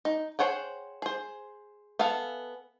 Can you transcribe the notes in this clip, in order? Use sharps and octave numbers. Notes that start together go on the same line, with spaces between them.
D#4
G#4 C5 C#5 F#5 G5
G#4 C5
B3 A4 E5 F5 G#5